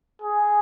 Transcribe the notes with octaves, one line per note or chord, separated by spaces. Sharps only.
G#4